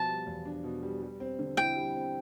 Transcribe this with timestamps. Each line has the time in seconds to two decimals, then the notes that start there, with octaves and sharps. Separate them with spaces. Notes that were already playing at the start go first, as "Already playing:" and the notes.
Already playing: B2 F3 A5
0.09 G3
0.26 E2
0.45 D4
0.64 B2
0.83 G3
1.02 G3
1.20 C4
1.39 D3
1.57 E4 G5
1.76 G3
1.95 C4